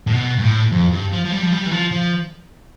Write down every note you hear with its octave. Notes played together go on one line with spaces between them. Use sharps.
A2
B2
G2
A2
F2
G2
F3
F3
G3
F3
G3
E3
F3
F3